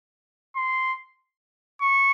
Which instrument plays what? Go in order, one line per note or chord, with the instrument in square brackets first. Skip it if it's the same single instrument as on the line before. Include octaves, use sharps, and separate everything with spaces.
[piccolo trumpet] C6
C#6